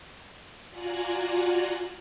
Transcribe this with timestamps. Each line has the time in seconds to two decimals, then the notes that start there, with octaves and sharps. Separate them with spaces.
0.70 F4 F#4 D5 G#5 A#5 F#6